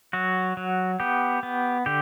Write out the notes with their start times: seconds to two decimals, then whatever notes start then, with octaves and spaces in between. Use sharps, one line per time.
0.13 F#3 F#4
0.57 F#3
1.00 B3 G4
1.43 B3
1.86 D3 G4